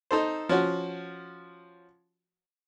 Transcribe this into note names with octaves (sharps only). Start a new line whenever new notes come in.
D#4 A4 C5
F3 C#4 F#4